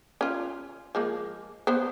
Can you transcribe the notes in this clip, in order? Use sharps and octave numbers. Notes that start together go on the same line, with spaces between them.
C#4 F4
F3 G#3 A#3
B3 C5